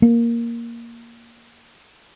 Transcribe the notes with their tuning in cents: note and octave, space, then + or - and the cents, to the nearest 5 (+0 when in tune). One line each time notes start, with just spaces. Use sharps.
A#3 +5